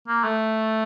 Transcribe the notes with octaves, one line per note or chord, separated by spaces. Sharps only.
A#3
A3